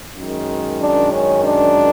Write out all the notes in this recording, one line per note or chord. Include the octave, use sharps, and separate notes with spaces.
F#2 D#3 G#3
D4
C#4
D4